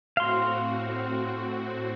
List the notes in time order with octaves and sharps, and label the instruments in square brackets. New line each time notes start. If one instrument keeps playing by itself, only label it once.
[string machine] A2 C4 F#4 [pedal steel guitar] F5 C6